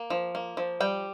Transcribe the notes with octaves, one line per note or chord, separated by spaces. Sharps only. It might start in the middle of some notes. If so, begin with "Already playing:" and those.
Already playing: A#3
F3
A#3
F3
G3 G5